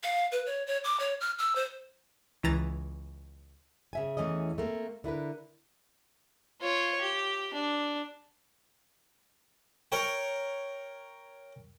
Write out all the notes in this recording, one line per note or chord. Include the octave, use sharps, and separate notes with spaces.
F5
B4
C#5
C#5
D6
C#5
F6
E6
C5
C#2 E3 A#5 A6
C#3 E5 G#5
E2 G#2 E3 A3 C#4 D#5
A3 A#3 C4
D3 E4 A#4 B4
F4 C#5
G4
D4
A#4 C#5 G5